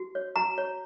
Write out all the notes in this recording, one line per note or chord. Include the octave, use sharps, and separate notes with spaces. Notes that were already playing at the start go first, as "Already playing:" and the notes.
Already playing: F#4
C#5
F#4 A#5
C#5